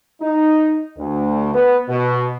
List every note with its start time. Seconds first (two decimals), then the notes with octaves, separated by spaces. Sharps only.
0.22 D#4
0.97 D2
1.54 B3
1.88 B2